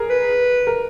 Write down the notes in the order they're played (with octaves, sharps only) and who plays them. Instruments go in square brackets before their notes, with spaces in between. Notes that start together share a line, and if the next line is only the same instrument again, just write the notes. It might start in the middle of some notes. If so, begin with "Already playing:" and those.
Already playing: [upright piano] G#4 A#4
[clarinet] B4
[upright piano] A#4